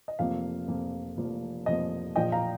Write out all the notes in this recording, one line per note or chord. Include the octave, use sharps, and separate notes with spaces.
D#5
F1 F2 F3 A#3 F5
F1 F2 F3 A#3
F1 F2 F3 A#3
F1 F2 F3 A#3 D#5
A#1 A#2 F3 D#5 G5
F5 A#5